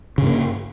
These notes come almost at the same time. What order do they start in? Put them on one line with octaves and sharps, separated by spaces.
C#3 G2 A#3